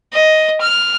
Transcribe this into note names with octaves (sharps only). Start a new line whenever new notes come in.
D#5
F6